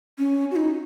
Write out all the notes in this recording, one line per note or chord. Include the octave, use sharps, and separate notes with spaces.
C#4
F#4
D#4